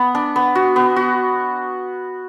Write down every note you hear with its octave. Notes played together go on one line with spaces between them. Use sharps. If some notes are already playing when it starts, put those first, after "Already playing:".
Already playing: B3
D4
B3
F#4
B3
F#4